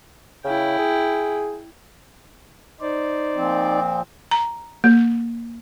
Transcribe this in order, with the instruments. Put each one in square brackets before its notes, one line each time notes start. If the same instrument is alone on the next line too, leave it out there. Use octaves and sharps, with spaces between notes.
[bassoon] C#3 [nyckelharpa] E4 G5
[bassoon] G#4
[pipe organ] D#4 C5 D5
[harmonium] A#2 F3 C4
[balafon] A#5
A#3